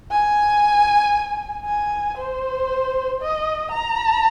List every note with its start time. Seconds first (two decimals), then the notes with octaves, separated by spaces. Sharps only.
0.11 G#5
1.65 G#5
2.18 C5
3.21 D#5
3.71 A#5